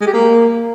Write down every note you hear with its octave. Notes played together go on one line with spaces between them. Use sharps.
G#3
G4
A#3